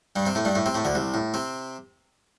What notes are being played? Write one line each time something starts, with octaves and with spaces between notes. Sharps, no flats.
G2 G3
C3 C4
A2 A3
G2 G3
A2 A3
C3 C4
A2 A3
D2 D3
C2 C3
A2
C3 C4